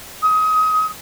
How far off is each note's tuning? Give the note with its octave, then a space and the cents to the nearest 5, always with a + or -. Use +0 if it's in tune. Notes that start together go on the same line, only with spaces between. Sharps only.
D#6 +25